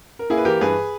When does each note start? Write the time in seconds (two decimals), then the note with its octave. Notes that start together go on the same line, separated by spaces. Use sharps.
0.19 A#4
0.30 A#3 E4 G#4
0.37 B4
0.45 E3 G4 A#4
0.61 G2 G#4 B4